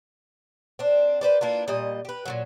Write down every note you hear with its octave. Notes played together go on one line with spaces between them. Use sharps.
C4 D4
B4 C5 D5
A#3 D4 E4 F4
A#2 G3 D#5
G4 B4
A#2 D#3 F#3